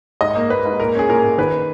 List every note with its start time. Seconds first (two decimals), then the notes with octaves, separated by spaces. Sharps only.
0.21 G#2 D#5
0.35 A#3
0.50 A#3 B4
0.65 G#2
0.80 A#2 A#4
0.95 C#4 G#4
1.09 A#2 A#4
1.24 A#2
1.38 D#3 B4